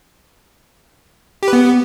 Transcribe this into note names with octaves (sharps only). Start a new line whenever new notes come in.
G4
B4
B3